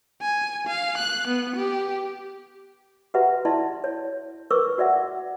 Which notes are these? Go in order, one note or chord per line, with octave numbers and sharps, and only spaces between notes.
G#5
F5
F#6
B3
G4
F#4 G4 B4 E5 F#5 A#5
E4 D5 E5 A5 C6
C#5
A#4 B4 C#6 D6 E6
F#4 D5 E5 F#5